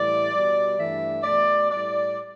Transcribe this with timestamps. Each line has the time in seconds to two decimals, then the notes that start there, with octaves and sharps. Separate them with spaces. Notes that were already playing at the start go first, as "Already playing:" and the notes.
Already playing: A2 E3 G3 D5
0.32 B2 G3
0.77 G2 E3 A3 E5
1.24 B2 A3 D5
1.70 A2 G3 D5